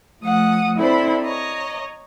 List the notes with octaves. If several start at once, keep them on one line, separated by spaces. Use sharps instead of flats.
F3 A3 F#5 D#6
C4 D4 E4 A4 C5 B5
C#5 D#5 A#5